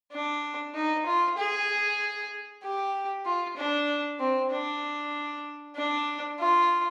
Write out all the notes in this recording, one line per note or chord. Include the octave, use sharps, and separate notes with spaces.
D4
D#4
F4
G#4
G4
F4
D4
C4
D4
D4
F4